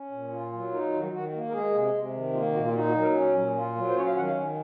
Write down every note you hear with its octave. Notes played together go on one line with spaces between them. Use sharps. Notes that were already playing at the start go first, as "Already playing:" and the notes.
Already playing: C#4
A#2
F4
F#3
D#4 A#4
D#3
F#4
D#3 F#4
A#3
A#4
G#3 G#4
C3
C3
D#3
A#3 F4
A#2 F#4
F4
D#4 F#4
F#4
F#3
A#4
C#4
A#2
F4
F#3
C5
C#4 C#5
F5
D#3 F#5
F5
D#3